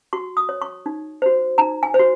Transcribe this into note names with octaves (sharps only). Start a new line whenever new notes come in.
F#4 C#6
D#6
C#5
C#6
D#4
F#4 C5
D#4 A#5
G#5
C5
F#4